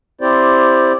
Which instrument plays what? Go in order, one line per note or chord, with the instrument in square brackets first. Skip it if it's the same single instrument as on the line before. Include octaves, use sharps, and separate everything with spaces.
[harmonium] C4 E4 G4 C5 D5